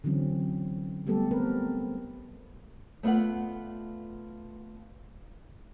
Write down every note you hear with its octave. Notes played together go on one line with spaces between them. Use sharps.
D3 E3 F#3 C4 C#4
G3 A3 B3 G4 A4
B3 C4 A#4 B4
A3 B3 F4 D5 F#5